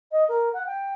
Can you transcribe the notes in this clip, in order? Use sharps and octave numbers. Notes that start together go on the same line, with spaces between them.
D#5
A#4
F#5
G5